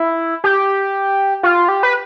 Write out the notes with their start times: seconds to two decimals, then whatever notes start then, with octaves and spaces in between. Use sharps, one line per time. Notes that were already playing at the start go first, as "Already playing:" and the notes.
Already playing: E4
0.44 G4
1.43 F4
1.68 G4
1.83 B4